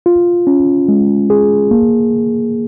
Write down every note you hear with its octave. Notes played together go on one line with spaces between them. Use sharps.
F4
C#4
G#3
G#4
A#3